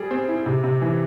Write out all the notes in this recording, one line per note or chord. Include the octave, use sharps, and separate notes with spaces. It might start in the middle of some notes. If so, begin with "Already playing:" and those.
Already playing: G3 G#4
C4
E4
C3
C3
E3